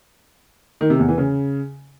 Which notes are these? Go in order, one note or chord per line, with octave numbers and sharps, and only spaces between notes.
D#3
C3
E2
E3
C#3